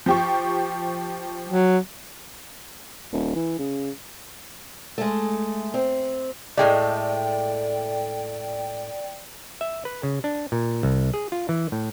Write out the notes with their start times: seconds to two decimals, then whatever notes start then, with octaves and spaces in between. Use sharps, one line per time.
0.06 F3 G4 C#6
1.49 F#3
3.12 D#1
3.36 E3
3.59 C#3
4.98 G#3 A3
5.74 C4
6.57 A2 G#3 A3 D5 G5
9.61 E5
9.85 B4
10.03 C#3
10.24 D4
10.52 A#2
10.83 C2
11.14 G#4
11.32 F4
11.49 E3
11.72 A2